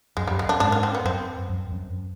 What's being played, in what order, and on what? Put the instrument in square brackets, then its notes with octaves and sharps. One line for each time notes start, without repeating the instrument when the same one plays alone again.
[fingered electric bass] F#2 [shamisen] G#3
[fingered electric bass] F#2 [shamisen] G3
[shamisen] G#3
[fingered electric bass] F#2 [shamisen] D4
[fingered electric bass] G#2 [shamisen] D4
[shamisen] C#4
C4
B3
[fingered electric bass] F#2 [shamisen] C4
[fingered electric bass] F#2
F#2